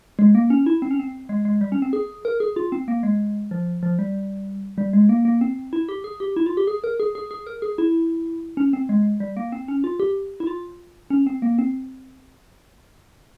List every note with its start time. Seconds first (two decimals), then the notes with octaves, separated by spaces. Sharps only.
0.19 G#3
0.35 A#3
0.50 C#4
0.66 E4
0.82 C4
0.91 C#4
0.99 C4
1.29 G#3
1.45 G#3
1.61 G3
1.72 C#4
1.82 C4
1.93 G#4
2.25 A#4
2.40 G#4
2.56 F4
2.72 C4
2.88 A#3
3.03 G#3
3.51 F3
3.83 F3
3.99 G3
4.78 G3
4.93 G#3
5.09 A#3
5.25 A#3
5.41 C4
5.73 E4
5.89 G4
6.04 G#4
6.20 G4
6.36 E4
6.46 F4
6.57 G4
6.67 G#4
6.84 A#4
7.00 G#4
7.15 G#4
7.31 G#4
7.47 A#4
7.62 G#4
7.78 E4
8.57 C#4
8.73 C4
8.89 G#3
9.20 G3
9.37 A#3
9.52 C4
9.68 C#4
9.84 F4
10.00 G4
10.40 E4
10.47 F4
11.10 C#4
11.27 C4
11.42 A#3
11.59 C4